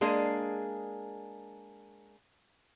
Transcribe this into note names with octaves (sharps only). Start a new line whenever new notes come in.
G#3 A#3 D4 G#4